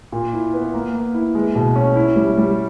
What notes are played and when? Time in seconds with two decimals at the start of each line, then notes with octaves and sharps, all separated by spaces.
0.12 A#2
0.33 E4
0.53 B3
0.74 A#3
0.94 A#3
1.14 E4
1.35 G#3
1.56 B2
1.76 C#4
1.96 E4
2.16 G3
2.38 G3